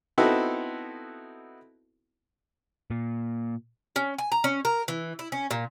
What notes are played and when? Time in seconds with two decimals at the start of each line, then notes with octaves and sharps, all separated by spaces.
0.18 B3 C4 D#4 E4 F#4 A4
2.90 A#2
3.96 C#4
4.18 G#5
4.32 A#5
4.44 C#4
4.65 A#4
4.88 E3
5.19 E4
5.32 C#4
5.51 A#2